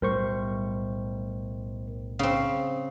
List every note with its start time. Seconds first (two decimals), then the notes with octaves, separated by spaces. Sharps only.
0.02 B1 A2 G3 A3 A#4 C5 C#6
2.19 C#3 C4